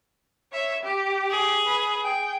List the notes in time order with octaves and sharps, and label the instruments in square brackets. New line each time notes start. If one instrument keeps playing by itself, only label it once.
[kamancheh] C#5 E5
G4
[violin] G#4
[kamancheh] B4
G#4 G5